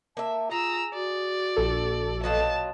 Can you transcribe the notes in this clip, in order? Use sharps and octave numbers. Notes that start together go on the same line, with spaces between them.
A#3 E5 A5
F4 G#4 A#5 E6
F#4 D5
A#1 A4
B2 F#3 F4 A5